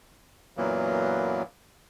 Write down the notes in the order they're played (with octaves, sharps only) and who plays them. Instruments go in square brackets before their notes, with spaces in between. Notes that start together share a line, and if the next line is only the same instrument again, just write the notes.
[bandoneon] F#2 A#2 E3 F#3 A#3 B3